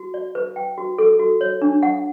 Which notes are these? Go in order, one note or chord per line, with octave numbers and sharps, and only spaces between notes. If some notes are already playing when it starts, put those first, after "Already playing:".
Already playing: F#4
D5
B4
G5
F#4
A4
F#4
C#5
D4
F#5